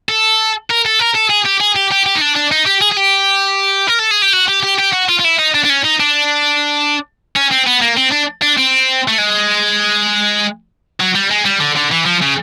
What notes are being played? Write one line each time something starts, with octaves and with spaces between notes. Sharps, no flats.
A4
A#4
A4
A#4
A4
G#4
G4
G#4
G4
G4
G4
D#4
D4
D4
D#4
G4
G#4
G#4
G4
A#4
A4
G#4
G4
F#4
G4
G4
G4
F#4
F4
F4
E4
D#4
D4
D4
C#4
D#4
D4
C#4
C4
B3
A#3
C4
D4
D4
C4
A3
G#3
F#3
G3
G#3
G3
D3
D3
E3
F3
C#3